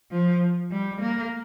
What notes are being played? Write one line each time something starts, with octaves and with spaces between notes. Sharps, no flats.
F3
G3
A#3